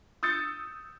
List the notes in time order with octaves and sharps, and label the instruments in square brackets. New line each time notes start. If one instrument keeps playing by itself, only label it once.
[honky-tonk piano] D#6 E6 G6 A6 C#7